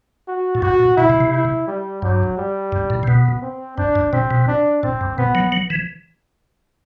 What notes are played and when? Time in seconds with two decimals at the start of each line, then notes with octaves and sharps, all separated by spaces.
0.28 F#4
0.55 A2
0.62 G2 F#4
0.80 A2
0.97 B2 E4
1.09 C3
1.20 C3
1.32 E4
1.68 G3
2.02 G2 F#3
2.38 G3
2.72 G2
2.90 A2
3.03 C3
3.07 B2 B3
3.42 C4
3.78 G2 D4
3.95 G2
4.13 B2 C4
4.31 B2
4.47 D4
4.83 A2 C4
5.01 G2
5.18 B2 B3
5.35 F#3
5.52 F#3
5.70 E3